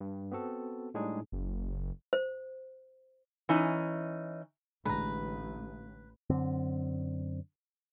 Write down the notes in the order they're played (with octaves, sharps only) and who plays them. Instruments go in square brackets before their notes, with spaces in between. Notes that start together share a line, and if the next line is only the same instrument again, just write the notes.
[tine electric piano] G2
B3 C4 F#4 A4
A2 G3 G#3 D4 D#4 G#4
[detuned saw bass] F#1
[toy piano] C5
[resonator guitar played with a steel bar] E3 C#4 D#4
[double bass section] A1 [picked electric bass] D3 G#3 [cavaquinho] B4 A#5
[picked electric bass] F#2 D3 C4